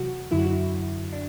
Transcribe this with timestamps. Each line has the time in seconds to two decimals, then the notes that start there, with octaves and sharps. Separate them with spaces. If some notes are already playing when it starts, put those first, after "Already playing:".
Already playing: E2 C3 F#3 F#4
0.31 F#2 D3 F#3 E4
0.38 F#4
0.46 E4
1.12 D4